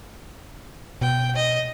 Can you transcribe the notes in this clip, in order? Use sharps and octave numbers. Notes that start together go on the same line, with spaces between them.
B2 G5
D#5